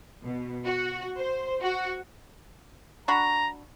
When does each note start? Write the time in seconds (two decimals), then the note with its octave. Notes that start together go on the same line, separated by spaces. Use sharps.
0.25 B2
0.65 F#4
1.19 C5
1.62 F#4
3.08 D4 F#4 A#5 B5